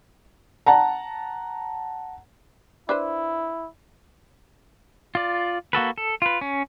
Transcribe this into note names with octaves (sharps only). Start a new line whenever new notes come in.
F#5 A5 A#5
D4 E4 B4 C5
F4 D5
A#3 F#4 A4 B4
A4
F4 B4
C#4